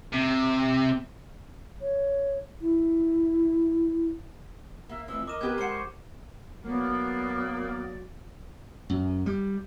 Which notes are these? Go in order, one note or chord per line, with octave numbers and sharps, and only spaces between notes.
C3
C#5
E4
A#3 E5
F2 A2 E3 F3 E6
A#4 D#5 D6 E7
B3 G4 B4 G#6
G#3 C5 F#5 C#7 D#7
C#6 D6
F#3 A#3 B3 D5
F#2
G3